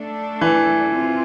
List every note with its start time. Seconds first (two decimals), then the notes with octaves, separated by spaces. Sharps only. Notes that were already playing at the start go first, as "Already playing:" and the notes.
Already playing: A3 D4 A4
0.41 E3
0.94 C4 F4